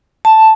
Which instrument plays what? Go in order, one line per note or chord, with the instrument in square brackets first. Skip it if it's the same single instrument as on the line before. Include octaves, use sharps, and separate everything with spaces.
[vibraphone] A5